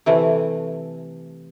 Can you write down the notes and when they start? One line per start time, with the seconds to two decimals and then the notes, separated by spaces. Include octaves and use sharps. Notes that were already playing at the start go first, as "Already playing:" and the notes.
0.06 C3 E3 A3